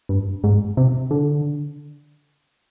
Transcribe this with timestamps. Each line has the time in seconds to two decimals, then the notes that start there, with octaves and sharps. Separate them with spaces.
0.09 G2
0.43 G#2
0.77 C3
1.11 D3